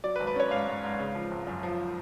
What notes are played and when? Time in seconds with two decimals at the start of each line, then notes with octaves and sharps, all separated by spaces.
0.04 F#3 D5
0.16 B4
0.20 G#1
0.27 B4
0.36 C#4 C#5
0.51 G#2 F5
0.67 G#2
0.84 G#2
1.00 C#3
1.15 F3
1.31 G#1
1.47 F#2
1.63 F3